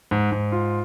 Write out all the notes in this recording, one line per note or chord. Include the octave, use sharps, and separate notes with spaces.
G#2
G#2
F4